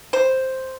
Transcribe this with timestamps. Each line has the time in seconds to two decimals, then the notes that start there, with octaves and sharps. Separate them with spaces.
0.13 C5